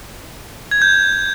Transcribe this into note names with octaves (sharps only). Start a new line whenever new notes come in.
G#6
G6